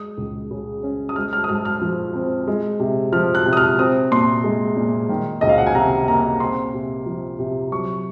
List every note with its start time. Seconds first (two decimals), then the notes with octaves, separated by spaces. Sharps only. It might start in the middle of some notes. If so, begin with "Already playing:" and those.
Already playing: G#3 D#6
0.18 C#2
0.51 C#3
0.83 C#4
1.09 D#6
1.16 G#3 F6
1.33 F6
1.44 D#6
1.49 G#2 F6
1.65 F6
1.82 F3
2.14 C4
2.47 G#3
2.80 C3
3.12 F3 F6
3.35 F#6
3.46 C3
3.53 D#6
3.57 F6
3.78 C4 D#6
4.12 A#2 C6
4.44 G#3
4.77 A#2
5.09 D#3
5.41 C#2 D#5
5.49 F5
5.58 F#5
5.67 G#5
5.75 C3 A#5
6.08 A#3 A#5
6.40 C4 C6
6.74 C3
7.06 F3
7.39 C3
7.71 F#3 C#6